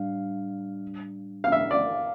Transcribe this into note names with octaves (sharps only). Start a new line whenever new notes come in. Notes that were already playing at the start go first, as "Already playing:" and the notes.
Already playing: A2 G3 D4 F5
F5
E5
D5